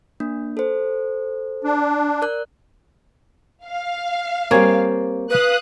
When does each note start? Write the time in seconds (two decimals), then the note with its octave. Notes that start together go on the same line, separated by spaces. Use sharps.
0.20 A#3 D4
0.57 A4 C5
1.64 D4
2.22 A#4 D5 F#6
3.65 F5
4.51 G3 A#3 C4 C#5 G#5
5.30 B4 F5 D#6 F#6